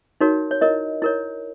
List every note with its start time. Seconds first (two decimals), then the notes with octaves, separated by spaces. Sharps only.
0.21 D#4 F#4 A#4 C#5
0.51 C#5
0.61 E4 A#4 C#5 D#5
1.02 E4 A#4 C#5